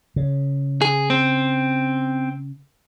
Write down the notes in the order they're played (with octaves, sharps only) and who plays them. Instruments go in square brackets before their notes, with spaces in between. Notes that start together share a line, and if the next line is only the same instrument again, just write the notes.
[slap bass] C#3
[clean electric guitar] G#4
C4